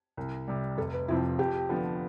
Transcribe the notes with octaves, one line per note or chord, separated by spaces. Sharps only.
C2
C3 G3
F1 A4
B4
F2 C3 F3 C4 E4
F2 G4
D3 F3 B3 D4